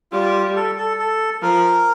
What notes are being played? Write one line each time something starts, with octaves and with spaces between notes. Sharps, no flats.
G3 F4
A4
A4
A4
F3 A#4